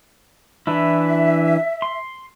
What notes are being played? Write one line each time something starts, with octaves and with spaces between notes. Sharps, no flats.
E3 D4 E4 E5
C6